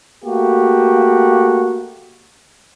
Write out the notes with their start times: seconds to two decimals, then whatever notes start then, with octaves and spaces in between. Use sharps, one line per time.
0.25 A3 A#3 F#4 G4